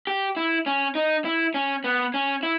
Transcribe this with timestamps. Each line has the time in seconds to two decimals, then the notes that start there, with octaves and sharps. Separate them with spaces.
0.07 G4
0.37 E4
0.66 C#4
0.95 D#4
1.25 E4
1.54 C#4
1.84 B3
2.14 C#4
2.43 E4